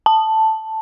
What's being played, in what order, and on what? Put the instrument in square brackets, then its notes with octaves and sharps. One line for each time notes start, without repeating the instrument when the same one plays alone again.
[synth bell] A5